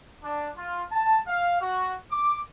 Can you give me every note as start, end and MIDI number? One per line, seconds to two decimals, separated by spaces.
0.24 0.50 62
0.57 0.84 65
0.92 1.21 81
1.27 1.58 77
1.61 1.94 66
2.11 2.40 86